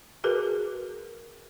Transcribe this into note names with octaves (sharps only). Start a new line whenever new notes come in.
F#4 G#4 A#4 B4